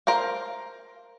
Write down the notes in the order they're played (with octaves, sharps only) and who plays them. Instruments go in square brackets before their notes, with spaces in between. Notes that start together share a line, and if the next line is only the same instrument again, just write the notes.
[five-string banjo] A#4 C5 F5